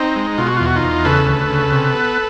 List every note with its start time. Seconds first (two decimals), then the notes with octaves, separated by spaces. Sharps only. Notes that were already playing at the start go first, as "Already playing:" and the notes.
Already playing: C4 D#4
0.16 G#3
0.38 B2 F4
0.47 F#4
0.57 E2 F4
0.66 F#4
0.76 D#4 F4
0.83 E2
1.05 C#3 A4 B4
1.27 D2
1.50 C#3
1.72 C3
1.95 B3